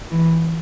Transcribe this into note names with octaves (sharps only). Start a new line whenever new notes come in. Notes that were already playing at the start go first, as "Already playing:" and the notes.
E3